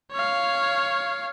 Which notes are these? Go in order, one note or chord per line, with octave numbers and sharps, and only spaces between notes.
C#5 F5